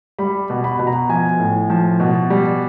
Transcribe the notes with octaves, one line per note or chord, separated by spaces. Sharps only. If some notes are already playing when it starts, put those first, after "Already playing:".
G3 B5
B2
B5
B2
A#5
F3 G#5
A2
F3
B2
G3